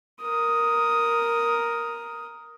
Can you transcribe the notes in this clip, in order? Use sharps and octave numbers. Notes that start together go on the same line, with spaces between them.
A#4 D#6